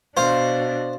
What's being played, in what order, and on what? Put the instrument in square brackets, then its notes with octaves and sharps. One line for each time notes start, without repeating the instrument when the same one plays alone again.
[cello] B2 D4 [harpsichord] C5 [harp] F5